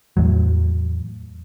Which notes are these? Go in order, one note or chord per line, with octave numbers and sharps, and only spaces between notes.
E2 A2 F#3